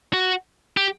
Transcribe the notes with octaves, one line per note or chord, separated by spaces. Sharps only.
F#4
G4